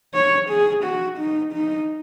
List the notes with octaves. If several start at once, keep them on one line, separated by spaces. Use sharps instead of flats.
C#5
G#4
F#4
D#4
D#4